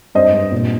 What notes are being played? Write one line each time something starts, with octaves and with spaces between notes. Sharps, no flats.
G2 C5 D#5
G2
A#2